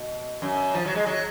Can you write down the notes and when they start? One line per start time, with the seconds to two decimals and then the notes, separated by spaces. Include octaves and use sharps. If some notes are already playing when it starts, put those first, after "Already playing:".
Already playing: B2
0.42 F#2
0.74 F3
0.85 F#3
0.95 G#3
1.06 F#3